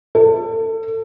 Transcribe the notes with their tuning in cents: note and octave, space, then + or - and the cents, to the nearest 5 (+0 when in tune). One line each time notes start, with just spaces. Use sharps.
A4 +30